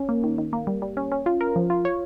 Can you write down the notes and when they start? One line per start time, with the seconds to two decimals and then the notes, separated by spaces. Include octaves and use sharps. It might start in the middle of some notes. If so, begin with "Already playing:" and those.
Already playing: C#4
0.09 A#3
0.24 D#3
0.38 D#3
0.53 A#3
0.67 G3
0.82 G3
0.97 C#4
1.12 C#4
1.26 F4
1.41 A#4
1.56 F3
1.70 F4
1.85 C#5